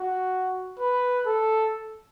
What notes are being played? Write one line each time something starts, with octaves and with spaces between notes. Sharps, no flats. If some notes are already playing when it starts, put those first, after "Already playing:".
Already playing: F#4
B4
A4